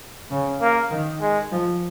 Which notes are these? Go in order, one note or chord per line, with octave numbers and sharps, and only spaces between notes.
C#3
A#3
D#3
G#3
F3